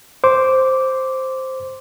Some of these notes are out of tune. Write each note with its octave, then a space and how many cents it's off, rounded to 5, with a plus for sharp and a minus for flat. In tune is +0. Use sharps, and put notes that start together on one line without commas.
C5 +0 D6 -10